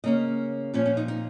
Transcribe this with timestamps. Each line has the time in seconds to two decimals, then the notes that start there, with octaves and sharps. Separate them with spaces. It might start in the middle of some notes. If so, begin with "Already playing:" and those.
0.04 C#3 A#3 C#4 D#5
0.74 A#2 F3 C#4
0.86 C#4
0.97 D#4
1.08 D#4